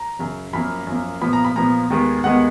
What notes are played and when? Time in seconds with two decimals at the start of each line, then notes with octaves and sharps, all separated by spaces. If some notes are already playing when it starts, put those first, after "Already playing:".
Already playing: A#5
0.19 F#2 C#3 F#3
0.53 F#2 F3 A#3 B5
0.87 F#2 F3 A#3
1.21 A#2 F3 B3 B5
1.33 A#5
1.45 B5
1.56 A#2 F3 B3 A#5
1.90 D#2 D#3 G#3 B3
2.24 D#2 D#3 G#3 B3 F#5